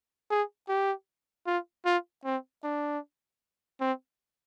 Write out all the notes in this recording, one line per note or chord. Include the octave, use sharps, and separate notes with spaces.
G#4
G4
F4
F4
C4
D4
C4